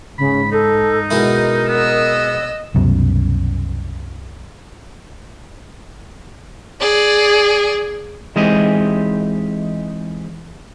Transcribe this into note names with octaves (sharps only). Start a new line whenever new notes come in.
G#2 C#3 B5
D#4 A4
B2 G#3 E4 A#4
B3 D#5 E6
C2 F#2 B2
G#4 D5
E3 G#3 C4 D#4 G4 D#5